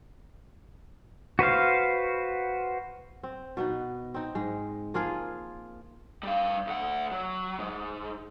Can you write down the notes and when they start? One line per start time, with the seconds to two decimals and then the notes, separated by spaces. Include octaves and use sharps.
1.39 F#4 B4 C5 F5
3.23 C4
3.57 B2 B3 D#4
4.14 C4 D#4
4.35 G#2 G#3
4.94 F3 A#3 F4 G#4
6.23 G3 F5
6.67 D2 F#5
7.12 F#3
7.59 G#2